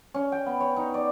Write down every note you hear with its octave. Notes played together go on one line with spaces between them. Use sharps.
C#4
G5
B3
C#5
D#4
D5